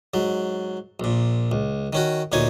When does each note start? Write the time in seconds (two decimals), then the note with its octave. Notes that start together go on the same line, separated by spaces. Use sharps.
0.14 G#2 F#3
1.00 A#1 A#2
1.52 C#2
1.93 D#3 C#4 F#4
2.32 D2 A#2 D#4 C#5 G#5